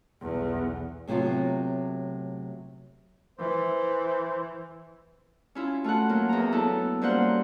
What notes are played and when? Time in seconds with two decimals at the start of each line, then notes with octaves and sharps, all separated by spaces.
0.21 B1 E2
1.07 A2 C3 F#3 B3 F4
3.39 E3 C5
5.55 C#4 E4 F4
5.84 A3 F4 F#4 F#5
6.09 F#3 A#3
6.29 E2 A#5
6.52 F#3 B3 E4 A4
7.02 F#2 G3 A#3 C5 F#5